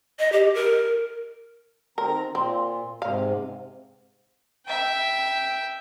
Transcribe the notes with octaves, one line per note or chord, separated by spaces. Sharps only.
D#5
G4
A#4
D#3 C4 A#4 A#5
A#2 C4
G#2 C3 F5
E5 G5